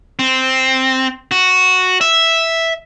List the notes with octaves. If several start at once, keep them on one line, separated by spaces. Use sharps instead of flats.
C4
F#4
E5